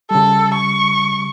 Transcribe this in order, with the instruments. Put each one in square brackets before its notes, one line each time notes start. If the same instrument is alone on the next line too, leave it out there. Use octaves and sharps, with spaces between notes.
[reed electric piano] C#3 G3 [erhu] A4
[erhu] C#6